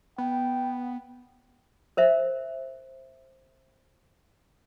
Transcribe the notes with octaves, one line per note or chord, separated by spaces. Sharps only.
B3 G5
A#4 C5 E5